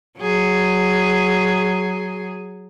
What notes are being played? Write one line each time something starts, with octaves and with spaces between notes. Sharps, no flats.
F#3 G#4